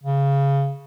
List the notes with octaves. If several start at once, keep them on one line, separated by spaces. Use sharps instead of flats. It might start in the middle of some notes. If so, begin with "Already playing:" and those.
C#3